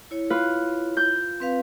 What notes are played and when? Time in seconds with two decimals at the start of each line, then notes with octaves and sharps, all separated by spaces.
0.11 E4 C#5
0.30 F4 B4
0.97 G6
1.40 C4 B4 F5